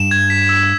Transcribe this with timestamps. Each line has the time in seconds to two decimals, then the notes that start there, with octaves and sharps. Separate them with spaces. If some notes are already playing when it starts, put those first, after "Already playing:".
Already playing: G2 E7
0.11 G#6
0.30 B6
0.49 E6